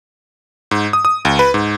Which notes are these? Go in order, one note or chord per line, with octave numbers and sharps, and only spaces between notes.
G#2
D#6
D#6
C#2
B4
G#2